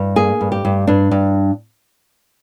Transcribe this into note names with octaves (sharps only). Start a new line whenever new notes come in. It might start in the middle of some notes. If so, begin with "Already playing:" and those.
Already playing: G2
A#3 G#4
G2
G4
G2
G2 D4
G2